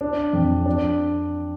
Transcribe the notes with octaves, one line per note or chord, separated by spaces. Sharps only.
D4
F2
D4